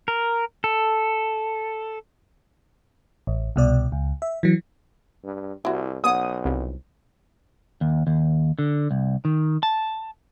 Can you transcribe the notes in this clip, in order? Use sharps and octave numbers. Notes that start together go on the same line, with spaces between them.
A#4
A4
A1
C2 B2 D5
C#2
E5
E3 F#3
G2
C2 E4 F#4
B1 B3 C#4 F#5 D#6
C2
D#2
D#2
D3
C2
D#3
A5